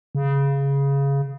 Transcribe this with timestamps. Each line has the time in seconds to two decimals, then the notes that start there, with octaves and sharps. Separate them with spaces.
0.15 C#3